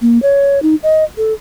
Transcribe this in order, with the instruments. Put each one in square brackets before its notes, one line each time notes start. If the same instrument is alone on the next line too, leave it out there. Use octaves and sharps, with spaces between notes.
[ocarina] A#3
C#5
D#4
D#5
A4